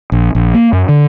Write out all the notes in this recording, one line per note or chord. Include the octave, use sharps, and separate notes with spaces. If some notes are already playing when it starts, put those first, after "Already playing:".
A#1
A#1
A#3
F#2
D3